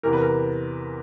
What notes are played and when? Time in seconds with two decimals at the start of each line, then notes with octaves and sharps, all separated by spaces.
0.03 E2 C3 E3 A#4
0.13 B4
0.22 A#4